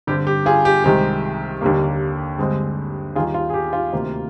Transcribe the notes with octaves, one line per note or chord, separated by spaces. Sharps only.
G2 D3 G3 C4 G4
G4
F4 G#4
G4
C2 C3 D#3 G#3 C4 G4
D#2 D3 G3 A#3
G2 D3 G#3 C4
D#2 D#3 G3 F4 G#4
F4
G#4
G4
F4
D2 C3 D#3 A#3